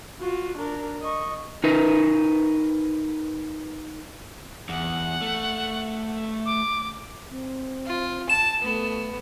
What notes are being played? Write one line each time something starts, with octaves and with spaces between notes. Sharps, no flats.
F4 F#4
D4 A#4
D#5 C#6
D#4 A#4 B4
E2 F#5
A3
D6
C4
F4
A5 E7
A3 B3